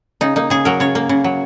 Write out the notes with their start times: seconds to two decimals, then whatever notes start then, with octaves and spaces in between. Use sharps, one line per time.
0.21 C#3 D#4
0.36 A#3 D#4
0.50 C#3 G#4
0.65 F#3 A#4
0.80 C#3 C#5
0.95 A#3
1.09 C#3
1.24 F#3